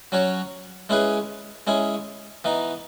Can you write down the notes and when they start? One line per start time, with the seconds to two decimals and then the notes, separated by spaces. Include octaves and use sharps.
0.12 F#3 C#4 F#4 C#5
0.89 G#3 C#4 E4 G#4 B4
1.67 G#3 C#4 E4 G#4
2.44 E3 B3 D#4